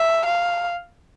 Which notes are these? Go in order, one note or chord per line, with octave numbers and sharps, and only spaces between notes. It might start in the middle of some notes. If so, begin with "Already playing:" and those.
Already playing: E5
F5